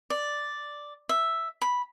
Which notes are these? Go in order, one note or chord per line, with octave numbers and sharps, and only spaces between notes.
D5
E5
B5